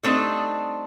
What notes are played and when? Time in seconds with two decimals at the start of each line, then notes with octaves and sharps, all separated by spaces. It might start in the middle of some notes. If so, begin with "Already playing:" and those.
0.03 G3 A3 C4 D4 D#4